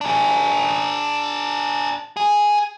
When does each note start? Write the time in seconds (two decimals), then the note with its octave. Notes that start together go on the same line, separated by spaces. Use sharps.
0.01 D4 G#4
2.17 G#4